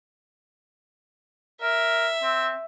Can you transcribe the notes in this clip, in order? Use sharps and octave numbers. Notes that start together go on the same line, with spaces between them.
A#4 E5
C4